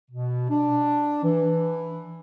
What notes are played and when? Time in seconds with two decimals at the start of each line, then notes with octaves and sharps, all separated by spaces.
0.11 B2
0.50 D4
1.23 E3